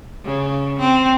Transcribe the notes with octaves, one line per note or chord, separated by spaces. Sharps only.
C#3
C4